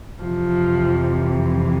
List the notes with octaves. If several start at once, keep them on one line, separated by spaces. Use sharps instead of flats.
F2 C3 E3 F3